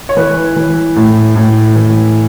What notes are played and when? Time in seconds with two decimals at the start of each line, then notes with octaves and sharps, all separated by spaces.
0.09 C#5
0.16 E3 B4
0.56 E3
0.96 A2
1.36 A2
1.76 E3